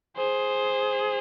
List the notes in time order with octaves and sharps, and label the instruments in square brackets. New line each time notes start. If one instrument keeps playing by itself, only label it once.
[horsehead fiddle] G#4 [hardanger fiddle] C5